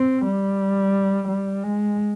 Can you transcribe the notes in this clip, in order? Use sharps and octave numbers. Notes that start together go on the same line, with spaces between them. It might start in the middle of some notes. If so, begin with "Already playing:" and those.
Already playing: C4
G3
G3
G#3